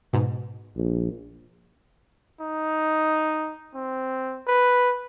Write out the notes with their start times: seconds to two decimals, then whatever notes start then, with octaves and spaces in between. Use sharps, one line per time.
0.13 G#2 B2
0.76 A#1
2.41 D#4
3.74 C4
4.47 B4